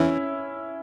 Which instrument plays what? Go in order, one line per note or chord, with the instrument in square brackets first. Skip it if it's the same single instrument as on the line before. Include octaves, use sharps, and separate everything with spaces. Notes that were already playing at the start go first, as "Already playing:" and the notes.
Already playing: [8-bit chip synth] E2 E3 [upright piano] C#4 E4